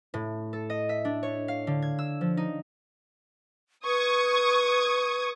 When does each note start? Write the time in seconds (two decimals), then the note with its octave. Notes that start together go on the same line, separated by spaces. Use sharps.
0.14 A2
0.53 A4
0.70 D#5
0.89 E5
1.05 D4
1.23 C#5
1.48 F5
1.67 D3
1.82 G#6
1.99 E6
2.21 F3
2.37 D#4
3.85 B4 C#6 D#6 G#6